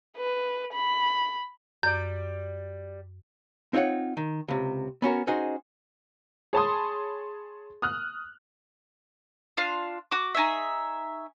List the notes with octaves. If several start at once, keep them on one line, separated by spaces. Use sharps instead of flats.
B4
B5
F#2 G3 D5 G6
C4 D#4 F4 C#5 F#5
D#3
C#2 C3
B3 C#4 F#4 A#4
C#4 D#4 F#4 G#4 C5 D#5
G#4 C#5 A5 B5 C6 D#6
D#6 F6 F#6
D4 F4 F5
F#4 D6
D#4 G#4 C#5 E5